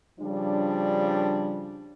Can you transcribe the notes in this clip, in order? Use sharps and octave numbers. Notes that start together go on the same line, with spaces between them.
C#3 F3 G3 D4